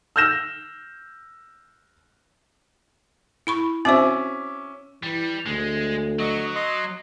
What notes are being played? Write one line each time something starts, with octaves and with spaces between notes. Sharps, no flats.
E6 F6 G6 A#6 E7
E4 B5 C#6
C4 C#4 F#4 C5 E5 D6
E3 G3
D2 G#3
F#3 D#5 C#6
D#5 C6